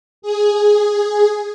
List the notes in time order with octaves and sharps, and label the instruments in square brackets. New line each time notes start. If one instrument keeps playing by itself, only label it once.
[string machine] G#4